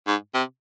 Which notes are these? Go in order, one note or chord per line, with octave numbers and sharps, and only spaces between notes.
G#2
C3